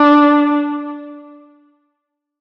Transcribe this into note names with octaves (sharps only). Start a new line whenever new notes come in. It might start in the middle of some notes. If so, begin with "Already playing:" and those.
Already playing: D4